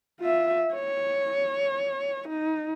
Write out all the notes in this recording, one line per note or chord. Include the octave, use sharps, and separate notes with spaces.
F4 E5
C#5
D#4